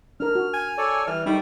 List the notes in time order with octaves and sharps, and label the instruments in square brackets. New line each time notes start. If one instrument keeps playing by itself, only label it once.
[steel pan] D4 A#4 [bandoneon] F6
[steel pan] F#4
[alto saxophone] G#5
[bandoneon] A4 C#5 D5
[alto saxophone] E3 [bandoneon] G3 F6
[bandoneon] G2 A3 B5 [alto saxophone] G3 [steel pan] D#4